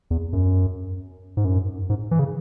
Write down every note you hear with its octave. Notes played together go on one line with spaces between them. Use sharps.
E2
F#2
G#2
F#2
G#2
E3
C#3